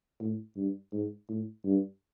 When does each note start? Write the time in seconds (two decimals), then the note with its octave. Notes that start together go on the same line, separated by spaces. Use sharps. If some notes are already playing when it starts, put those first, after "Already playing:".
0.20 A2
0.56 G2
0.93 G#2
1.29 A2
1.65 G2